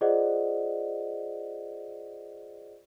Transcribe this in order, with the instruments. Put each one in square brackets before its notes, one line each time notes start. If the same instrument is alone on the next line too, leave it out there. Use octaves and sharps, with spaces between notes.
[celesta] F4 G#4 C5 D5 D#5 F#5